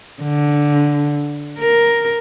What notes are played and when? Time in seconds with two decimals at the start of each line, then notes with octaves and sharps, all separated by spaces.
0.23 D3
1.59 A#4